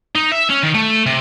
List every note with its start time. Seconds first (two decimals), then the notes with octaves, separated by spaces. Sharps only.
0.15 D#4
0.32 E5
0.50 C#4
0.63 D#3
0.75 A3
1.06 C3